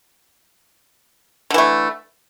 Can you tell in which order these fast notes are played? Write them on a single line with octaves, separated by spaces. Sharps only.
D3 E3 A3